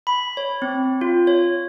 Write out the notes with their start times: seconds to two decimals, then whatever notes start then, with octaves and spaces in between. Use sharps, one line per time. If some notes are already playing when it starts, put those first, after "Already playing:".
0.07 B5
0.37 C#5
0.62 C4
1.01 F4
1.27 C#5